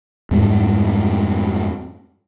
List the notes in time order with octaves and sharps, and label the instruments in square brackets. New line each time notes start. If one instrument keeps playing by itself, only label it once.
[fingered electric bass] F2 G#2 G3 A3